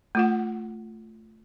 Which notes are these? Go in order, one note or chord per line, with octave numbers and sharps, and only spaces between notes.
A3 F4 F#5